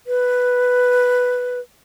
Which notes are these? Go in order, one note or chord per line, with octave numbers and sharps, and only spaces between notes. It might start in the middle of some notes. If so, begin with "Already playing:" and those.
B4